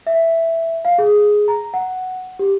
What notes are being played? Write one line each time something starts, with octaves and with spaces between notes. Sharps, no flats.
E5
F5
G#4
A#5
F#5
G4